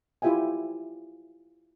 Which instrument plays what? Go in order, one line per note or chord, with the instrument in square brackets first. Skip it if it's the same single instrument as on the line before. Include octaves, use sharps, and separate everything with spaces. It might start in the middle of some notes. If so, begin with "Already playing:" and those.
[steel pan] E4 F4 G4 E5 G5 G#5